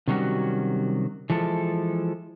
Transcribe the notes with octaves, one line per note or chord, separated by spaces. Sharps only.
C3 D#3 F#3 G3 C#4 F#4
E3 F3 G#3 A4